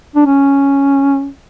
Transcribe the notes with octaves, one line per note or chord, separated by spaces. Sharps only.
D4
C#4